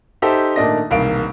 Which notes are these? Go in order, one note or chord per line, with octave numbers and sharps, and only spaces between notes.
D#4 G4 A4 C5 E5
A#2 D#3 A3 D4 D#5 A#6
E1 C2 D#3 A#3 F5 D7